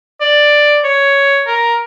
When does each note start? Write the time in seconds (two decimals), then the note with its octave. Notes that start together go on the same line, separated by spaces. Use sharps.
0.21 D5
0.84 C#5
1.47 A#4